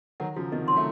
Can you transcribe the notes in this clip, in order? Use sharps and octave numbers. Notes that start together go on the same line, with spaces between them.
D#3 F#3 F#5
C#3 F3 F#4
C3 D#3 D#5
F#3 C6
A3